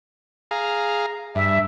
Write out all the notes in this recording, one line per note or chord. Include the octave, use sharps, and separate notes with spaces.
G#4 F5 A#5
G2 E5